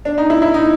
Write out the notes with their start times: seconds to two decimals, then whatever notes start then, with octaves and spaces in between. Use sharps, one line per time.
0.05 D4
0.18 D#4
0.30 E4
0.42 E4
0.54 D#4